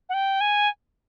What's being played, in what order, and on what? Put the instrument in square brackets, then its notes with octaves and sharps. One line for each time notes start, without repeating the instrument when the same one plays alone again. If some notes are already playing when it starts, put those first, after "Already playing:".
[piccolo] F#5
G5
G#5